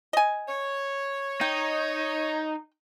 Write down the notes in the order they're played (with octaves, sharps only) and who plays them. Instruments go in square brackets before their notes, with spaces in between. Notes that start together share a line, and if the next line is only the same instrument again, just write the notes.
[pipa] D#5 G#5
[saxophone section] C#5
[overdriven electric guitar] D#4 [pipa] G5